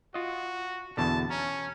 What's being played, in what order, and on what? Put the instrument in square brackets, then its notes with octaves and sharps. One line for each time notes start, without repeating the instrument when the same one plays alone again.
[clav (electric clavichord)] F4 D#5 [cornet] F#4
[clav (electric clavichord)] E2 B2 D3 [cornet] A5
[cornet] C#4 [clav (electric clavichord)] A#5